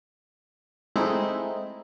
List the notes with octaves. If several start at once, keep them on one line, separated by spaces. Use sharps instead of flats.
G#3 A3 C4 D#4 E4